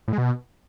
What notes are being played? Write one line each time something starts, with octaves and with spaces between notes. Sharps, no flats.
A2
G#3
B2